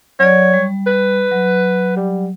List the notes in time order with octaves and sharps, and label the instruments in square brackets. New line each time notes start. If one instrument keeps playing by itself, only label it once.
[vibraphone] F#3 D5 [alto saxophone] C#5
[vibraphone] G3
[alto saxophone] B4
[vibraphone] F#3
[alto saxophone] G3